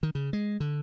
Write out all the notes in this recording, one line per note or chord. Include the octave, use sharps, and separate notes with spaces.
D#3
C#3
G#3
D3